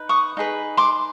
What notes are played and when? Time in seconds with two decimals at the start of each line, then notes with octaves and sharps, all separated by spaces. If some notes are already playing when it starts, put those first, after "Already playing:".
Already playing: D#4 B4
0.09 C#6 D#6
0.37 D#4 G#4 B4
0.77 C6 D6